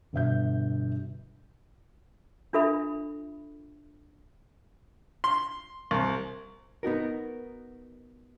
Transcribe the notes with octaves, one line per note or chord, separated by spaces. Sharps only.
G1 B2 E5 G6
D4 F4 A4 E5 B5
C6
C2
B3 D#4 F#4 A#4